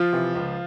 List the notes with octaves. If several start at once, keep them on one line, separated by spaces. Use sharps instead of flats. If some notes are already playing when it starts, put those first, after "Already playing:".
Already playing: F3 F4
C3 E3
C#2